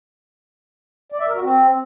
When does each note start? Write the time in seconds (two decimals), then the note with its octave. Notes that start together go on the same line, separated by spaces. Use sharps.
1.12 D5
1.20 E5
1.27 A#4
1.35 F#4
1.43 C4